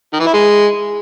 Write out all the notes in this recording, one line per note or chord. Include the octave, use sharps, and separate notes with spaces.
D#3
E3
E4
G#3